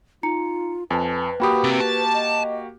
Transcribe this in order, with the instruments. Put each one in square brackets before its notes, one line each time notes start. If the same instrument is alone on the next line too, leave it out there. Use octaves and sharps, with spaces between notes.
[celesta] D#4 A#5 C#7 [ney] F4
[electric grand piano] F2 [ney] B4 [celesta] G#5 A5
[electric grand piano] A#3 F#4 G4 [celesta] G5 B5 D#6
[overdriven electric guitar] C3 [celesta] A6
[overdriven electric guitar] A5
[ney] D#5